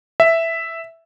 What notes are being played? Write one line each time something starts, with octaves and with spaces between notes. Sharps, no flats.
E5